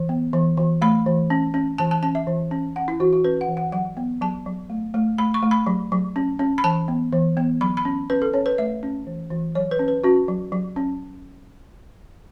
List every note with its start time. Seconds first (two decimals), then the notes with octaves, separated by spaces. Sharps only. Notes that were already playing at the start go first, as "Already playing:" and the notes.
Already playing: E3
0.09 B3
0.33 E3
0.57 E3
0.82 A3 B5
1.06 E3
1.30 C#4
1.54 C#4
1.78 E3 A5
1.91 A5
2.03 C#4 A5
2.15 E5
2.27 E3
2.51 C#4
2.76 C#4 F#5
2.88 E4
3.00 E3 F#4
3.13 F#4
3.24 C#4 B4
3.41 F#5
3.49 E3
3.57 F#5
3.72 F#3 F#5
3.97 B3
4.21 F#3 A5
4.46 F#3
4.70 A3
4.94 A3
5.18 A3 B5
5.34 C#6
5.43 A3
5.51 B5
5.66 F#3
5.92 F#3
6.16 C#4
6.39 C#4
6.58 B5
6.64 E3 A5
6.88 B3
7.12 E3
7.37 B3
7.61 F#3 B5
7.77 B5
7.85 C#4
8.10 C#4 B4
8.22 A4
8.33 C#4 C#5
8.46 B4
8.58 A3 E5
8.83 C#4
9.07 E3
9.31 E3
9.55 F#3 C#5
9.71 B4
9.79 C#4
9.88 B4
10.04 C#4 F#4
10.28 F#3
10.52 F#3
10.76 C#4